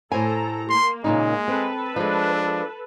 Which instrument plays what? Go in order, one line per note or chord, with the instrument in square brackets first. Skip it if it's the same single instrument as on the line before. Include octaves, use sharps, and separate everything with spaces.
[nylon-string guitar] A2 C5 G#5 [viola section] A4 A#5
[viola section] A#3 [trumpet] C6
[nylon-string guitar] A#2 C#3 D#4 [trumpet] G#3
[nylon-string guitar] C4 [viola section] A4 B4
[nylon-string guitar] F3 G#3 [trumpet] D4